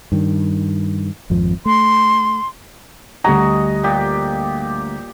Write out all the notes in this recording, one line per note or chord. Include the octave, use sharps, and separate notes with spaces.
G2 D#3
G#1 F2 F3
A3 C6
D2 G3 F#4 D#5 G#5 A#5
A#2 G4